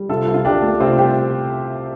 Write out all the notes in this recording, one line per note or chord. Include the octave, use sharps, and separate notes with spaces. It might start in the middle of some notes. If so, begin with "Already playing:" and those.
Already playing: G3
C3 F4 A4
C2
F4
C2 D4 G4
A3
C3 C4 F4
C2 G4 C5